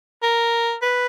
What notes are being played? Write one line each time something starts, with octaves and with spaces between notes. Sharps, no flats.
A#4
B4